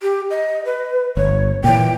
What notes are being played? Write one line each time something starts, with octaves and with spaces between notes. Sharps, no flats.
G4
D#5
B4
G1 C#5
A#2 E3 G5